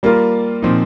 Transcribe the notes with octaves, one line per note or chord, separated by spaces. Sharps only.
G3 A#3 F4 A#4
A#2 F3 C4 D#4